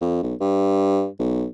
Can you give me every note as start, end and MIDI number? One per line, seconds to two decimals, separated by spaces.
0.01 0.23 41
0.23 0.34 35
0.40 1.08 43
1.19 1.46 35